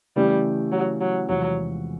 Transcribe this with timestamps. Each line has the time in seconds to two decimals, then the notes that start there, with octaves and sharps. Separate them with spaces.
0.16 C#3 E3 G3 A3
0.72 F#3
1.01 F#3
1.28 E2 C3 F3 F#3 G#3